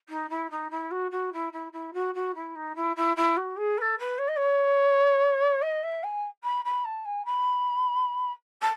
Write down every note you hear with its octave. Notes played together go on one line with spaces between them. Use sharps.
D#4
E4
D#4
E4
F#4
F#4
E4
E4
E4
F#4
F#4
E4
D#4
E4
E4
E4
F#4
G#4
B4
A4
B4
C#5
D#5
C#5
D#5
E5
G#5
B5
B5
A5
G#5
B5
A5